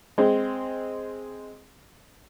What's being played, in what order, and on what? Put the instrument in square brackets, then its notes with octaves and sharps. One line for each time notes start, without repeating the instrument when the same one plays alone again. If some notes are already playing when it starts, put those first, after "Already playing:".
[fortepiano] G#3 C4